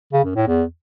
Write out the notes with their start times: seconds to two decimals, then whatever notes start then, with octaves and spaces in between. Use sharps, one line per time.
0.13 C#3
0.24 F#2
0.36 A2
0.47 E2